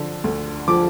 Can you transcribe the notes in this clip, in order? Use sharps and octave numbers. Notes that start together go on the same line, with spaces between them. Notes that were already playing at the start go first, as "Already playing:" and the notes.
Already playing: D3 F3
D2
F3 D6